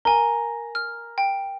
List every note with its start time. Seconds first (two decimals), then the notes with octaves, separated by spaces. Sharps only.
0.05 A#4 G#5 A#5
0.75 F6
1.18 G5